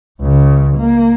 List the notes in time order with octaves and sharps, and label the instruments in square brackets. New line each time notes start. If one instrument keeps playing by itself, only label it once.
[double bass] C#2 C#3
A#3